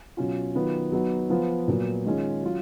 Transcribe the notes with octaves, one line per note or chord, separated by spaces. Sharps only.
B2 F#3 C#4 F4
D#3 F#3 B3 F4
F#3 B3 D#4
F3 B3 F4
A#2 F#3 B3
D#3 G#3 C#4 F4
F#3 C#4 F4